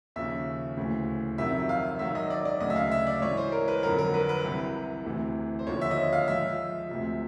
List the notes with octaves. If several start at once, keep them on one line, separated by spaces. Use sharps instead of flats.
D#2 C#3 F3 E5
D2 C#3 E3
F2 C3 D#3 F#3 E5
F5
G#2 D#3 F#3 E5
D#5
D5
D5
D2 C#3 F#3 D#5
E5
F5
E5
D5
G#2 E3 C#5
C5
A#4
B4
F2 D3 F#3 A#4
A#4
B4
B4
C2 C3 E3
D2 C3 E3
C5
D#2 D3 F3 C#5
E5
D#5
E5
F5
G#2 F3 E5
D2 C3 F3